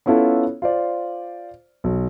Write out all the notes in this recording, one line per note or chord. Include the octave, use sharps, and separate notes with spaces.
B3 C#4 E4 F4 A4 C#5
F4 C5 D5
B1